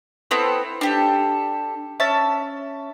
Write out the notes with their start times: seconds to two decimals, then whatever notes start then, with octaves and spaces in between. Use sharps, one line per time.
0.31 B3 C4 E4 A4
0.81 D4 G4 A4
2.00 C#4 E5 A5